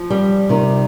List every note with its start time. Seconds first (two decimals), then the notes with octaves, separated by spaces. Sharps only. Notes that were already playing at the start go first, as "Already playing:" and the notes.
Already playing: F3
0.10 G3
0.49 C3 D#3